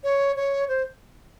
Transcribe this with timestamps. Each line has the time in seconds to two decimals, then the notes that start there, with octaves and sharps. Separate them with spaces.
0.04 C#5
0.36 C#5
0.68 C5